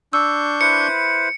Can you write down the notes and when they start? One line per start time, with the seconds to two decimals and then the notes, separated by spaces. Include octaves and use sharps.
0.13 D4 C#6 E6 G6
0.61 E4 B4 C5 C#7